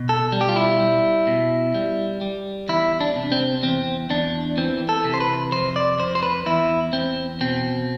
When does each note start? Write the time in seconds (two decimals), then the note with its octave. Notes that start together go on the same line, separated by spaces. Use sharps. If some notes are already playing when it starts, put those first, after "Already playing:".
Already playing: B2
0.09 A4
0.32 G3
0.41 G4
0.49 F4
0.56 E4
0.80 G3
1.27 B2
1.74 G3
2.21 G3
2.69 E2 E4
3.01 D4
3.16 C3
3.32 C4
3.63 E2 C4
4.10 E2 D4
4.57 E3 C4
4.89 A4
5.05 C3
5.14 C5
5.20 B4
5.52 F2 C5
5.76 D5
5.99 F2 C5
6.15 C5
6.23 B4
6.46 E2 E4
6.93 E2 C4
7.41 B2 C4